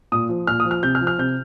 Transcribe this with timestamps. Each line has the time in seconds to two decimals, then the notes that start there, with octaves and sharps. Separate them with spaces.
0.12 A#2 D#6
0.29 F3
0.47 A#2 F6
0.60 D#6
0.65 F3
0.71 F6
0.83 C3 G6
0.95 F6
1.01 F3
1.07 F6
1.19 C3 G6